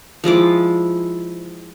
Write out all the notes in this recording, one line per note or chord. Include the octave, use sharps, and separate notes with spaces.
F3 G#3 E4 D6